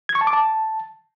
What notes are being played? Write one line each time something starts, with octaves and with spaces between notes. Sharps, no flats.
G#6
C#6
A5
D6
A5